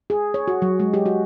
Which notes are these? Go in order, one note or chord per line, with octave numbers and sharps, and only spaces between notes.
G#4
C#5
F#4
F#3
G#3
G4
F#4